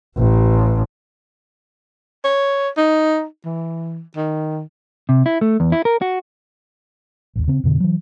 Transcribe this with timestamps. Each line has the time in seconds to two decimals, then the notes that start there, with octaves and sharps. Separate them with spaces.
0.18 A1
2.24 C#5
2.77 D#4
3.45 E3
4.16 D#3
5.09 C3
5.26 E4
5.41 A3
5.60 E2
5.72 E4
5.85 A#4
6.02 F#4
7.36 A1 D#2
7.48 C#3 C4
7.63 F2 B2 D3
7.80 E3 F#3